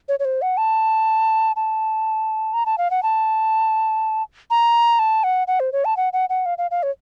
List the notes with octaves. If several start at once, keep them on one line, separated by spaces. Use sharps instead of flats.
C#5
C#5
C5
F#5
A5
A5
A#5
A5
F5
F#5
A5
A#5
A5
F#5
F#5
C5
C#5
A5
F#5
F#5
F#5
F5
F5
F5
C#5